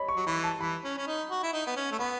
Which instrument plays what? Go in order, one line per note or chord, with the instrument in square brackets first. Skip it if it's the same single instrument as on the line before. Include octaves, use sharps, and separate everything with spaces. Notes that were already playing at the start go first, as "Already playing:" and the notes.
Already playing: [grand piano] C#5 D#5 B5
C#6
[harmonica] F#3
[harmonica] E3 [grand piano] B5
[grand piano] A5
[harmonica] E3 [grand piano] B5
[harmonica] C#4
C#4
D#4
F#4
E4
D#4
B3
C#4
A3
[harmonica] B3 [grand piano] B5